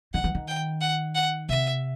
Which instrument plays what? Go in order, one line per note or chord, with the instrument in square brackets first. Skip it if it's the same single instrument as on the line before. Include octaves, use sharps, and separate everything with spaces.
[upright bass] D#3 [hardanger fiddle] F#5
[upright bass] E3
D#3
[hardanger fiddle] G5
F#5
F#5
[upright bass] C3 [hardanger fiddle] E5